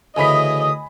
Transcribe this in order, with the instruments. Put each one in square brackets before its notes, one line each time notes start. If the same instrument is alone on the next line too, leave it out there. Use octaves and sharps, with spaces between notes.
[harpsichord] D2 C#3 E3 [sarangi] D#5 [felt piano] G#5 B5 B6 [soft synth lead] D#6